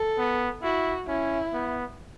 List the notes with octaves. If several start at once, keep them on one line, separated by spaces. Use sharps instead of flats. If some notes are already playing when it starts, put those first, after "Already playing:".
Already playing: A4
B3
E4 F#4
C#4 E4
B3